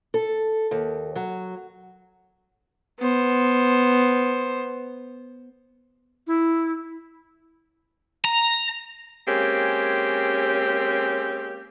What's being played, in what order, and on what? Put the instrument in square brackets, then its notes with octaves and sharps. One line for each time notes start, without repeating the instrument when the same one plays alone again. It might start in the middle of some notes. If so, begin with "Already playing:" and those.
[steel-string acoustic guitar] A4
D#2
F#3
[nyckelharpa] B3 C5
[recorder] E4
[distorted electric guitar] A#5
[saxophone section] G#3 A#3 C4 C#4 G4